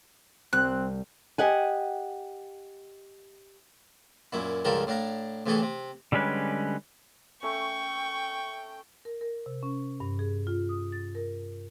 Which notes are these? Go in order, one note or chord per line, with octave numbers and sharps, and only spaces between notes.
C2 C4 F#6
G4 D#5 F#5 G#5
F#2 A#2 E4
C#2 G#2 F3 G3 A4 A#4
A2 D4 F5 A#5
A2 C3 E3 G#4 A4 C#6
C3
D3 G3 G#3 C#4 B4
A3 C#4 G5 C#6
A#4
A#4
C3
C#4
G2
G#4
F4
D#6
A6
A#4